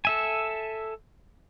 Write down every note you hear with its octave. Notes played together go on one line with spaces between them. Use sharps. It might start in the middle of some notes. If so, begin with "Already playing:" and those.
A4 E5 G#5